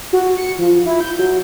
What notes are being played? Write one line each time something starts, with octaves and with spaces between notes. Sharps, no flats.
F#4
C#7
F3
E4
G6
F#3